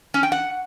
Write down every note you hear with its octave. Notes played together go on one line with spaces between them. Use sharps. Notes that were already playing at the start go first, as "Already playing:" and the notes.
C#4
G5
F#5